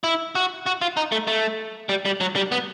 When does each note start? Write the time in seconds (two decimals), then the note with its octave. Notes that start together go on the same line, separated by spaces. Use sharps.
0.04 E4
0.35 F#4
0.66 F#4
0.82 F4
0.97 D#4
1.12 A3
1.27 A3
1.89 G3
2.05 G3
2.21 F#3
2.36 G3
2.52 B3